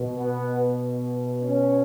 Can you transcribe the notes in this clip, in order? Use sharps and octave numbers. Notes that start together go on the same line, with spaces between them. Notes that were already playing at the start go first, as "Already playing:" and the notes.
Already playing: B2
B3
C#4